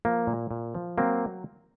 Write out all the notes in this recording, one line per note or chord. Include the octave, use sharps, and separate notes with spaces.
F3 A#3
A#2
A#2
F3
F#3 A#3 C4